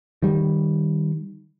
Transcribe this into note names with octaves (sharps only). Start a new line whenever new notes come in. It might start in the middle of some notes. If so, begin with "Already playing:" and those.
D#3 G3